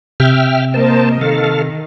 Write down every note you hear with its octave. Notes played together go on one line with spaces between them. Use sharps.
C3 E5 G5 F6
A#3 A#4 C5 D#5 A5
D#3 A4 F5